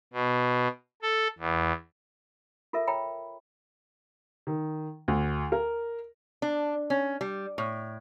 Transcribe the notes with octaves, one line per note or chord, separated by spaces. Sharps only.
B2
A4
E2
F4 A4 A#4 E5
C#5 G5 A#5 B5
D#3
D2
A#4
D4
C#4
G3
A2